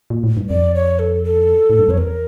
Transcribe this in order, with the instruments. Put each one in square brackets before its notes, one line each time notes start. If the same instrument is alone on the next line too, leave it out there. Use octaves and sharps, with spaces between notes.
[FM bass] A#2
A2
G2
[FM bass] F2 [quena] D5
[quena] C#5
A4
A4
[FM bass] A2
G2
[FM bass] F2 [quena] C#5
[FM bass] E2 [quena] A#4